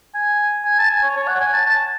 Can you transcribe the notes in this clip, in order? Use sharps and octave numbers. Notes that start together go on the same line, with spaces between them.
G#5
G#5
A5
G#5
C#5
C#5
F#5
G#5
A5
A5